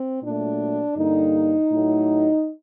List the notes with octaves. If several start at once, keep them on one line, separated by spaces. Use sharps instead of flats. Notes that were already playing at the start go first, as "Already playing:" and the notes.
Already playing: C4
A#2 F#3 A3 D4
G2 D3 G3 A#3 D#4
A2 F#3 A3